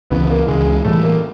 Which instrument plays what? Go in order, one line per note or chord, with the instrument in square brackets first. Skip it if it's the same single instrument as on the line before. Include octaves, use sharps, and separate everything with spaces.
[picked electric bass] C#2 C#3 E3 [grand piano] B3
[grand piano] B3
A#3
[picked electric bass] C#2 C#3 E3 [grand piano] G#3
[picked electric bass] A2 E3 G3 [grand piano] A3
[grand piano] A#3